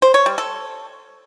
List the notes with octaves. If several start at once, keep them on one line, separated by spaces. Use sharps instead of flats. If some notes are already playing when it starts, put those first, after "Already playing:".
C5
C#5
G3
A4